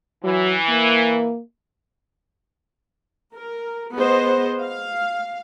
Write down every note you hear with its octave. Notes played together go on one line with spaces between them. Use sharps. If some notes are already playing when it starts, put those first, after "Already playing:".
E3 F#3
A#3
A#4
B3 G#4 C5 D#5
F5